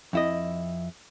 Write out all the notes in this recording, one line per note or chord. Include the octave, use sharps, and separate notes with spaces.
F2 E4 D#5